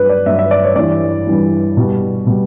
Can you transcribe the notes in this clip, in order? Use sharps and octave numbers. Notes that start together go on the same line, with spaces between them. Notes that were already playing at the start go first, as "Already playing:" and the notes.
Already playing: G2 F#3 B4
D5
G2 F#3 E5
E5
D5
C#5
G2 E3 G3 D5
G2 E3 G3
B2 G3
B2 G3